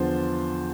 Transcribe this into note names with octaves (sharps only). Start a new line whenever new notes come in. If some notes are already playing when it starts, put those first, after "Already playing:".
Already playing: E2 D3 F3 C5